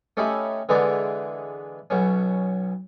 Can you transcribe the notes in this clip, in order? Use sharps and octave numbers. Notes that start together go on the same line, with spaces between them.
A3 C#4 D#4 G4 E5 B5
D3 E3 G#3 B3 D5 D6
B1 B2 C#4